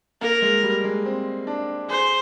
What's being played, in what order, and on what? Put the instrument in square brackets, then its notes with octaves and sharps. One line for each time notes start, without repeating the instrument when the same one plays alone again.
[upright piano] A#3 [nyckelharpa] A#4
[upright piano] G#3
G3
G#3
C4
D4
[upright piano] G#4 [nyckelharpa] C5